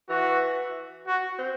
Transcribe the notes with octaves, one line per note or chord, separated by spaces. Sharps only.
E3 F#4
F#4
C4